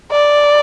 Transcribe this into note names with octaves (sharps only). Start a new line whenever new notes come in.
D5